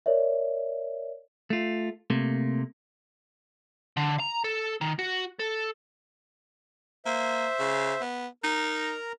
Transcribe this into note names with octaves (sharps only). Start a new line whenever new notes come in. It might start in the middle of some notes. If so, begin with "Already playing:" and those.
A#4 C#5 D5 E5
A3 F4
C3 A3 A#3
D3
A#5
A4
D#3
F#4
A4
A#3 C5 E5
C#3
B3
D#4 A#4 A#5